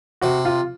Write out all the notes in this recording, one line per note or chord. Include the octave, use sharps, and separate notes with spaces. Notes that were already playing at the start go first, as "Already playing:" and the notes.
C3 F#4
F4